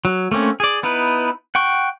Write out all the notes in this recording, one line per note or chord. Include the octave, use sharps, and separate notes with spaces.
F#3
A3 A#3 C4 C#4
G#4 D5
B3 D#4 E4 B4
F#5 G5 C#6